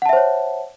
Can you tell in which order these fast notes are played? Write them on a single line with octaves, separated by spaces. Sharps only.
F#5 A5 E5 C5 C#5